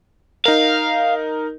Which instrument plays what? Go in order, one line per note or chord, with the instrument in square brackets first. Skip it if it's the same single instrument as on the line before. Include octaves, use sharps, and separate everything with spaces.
[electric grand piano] D#4 A#4 [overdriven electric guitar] F5